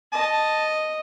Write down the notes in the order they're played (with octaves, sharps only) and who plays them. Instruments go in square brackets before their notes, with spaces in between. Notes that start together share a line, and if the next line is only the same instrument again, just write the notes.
[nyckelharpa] D#5 [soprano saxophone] A5